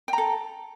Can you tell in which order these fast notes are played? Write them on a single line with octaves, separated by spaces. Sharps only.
G5 A#5 A4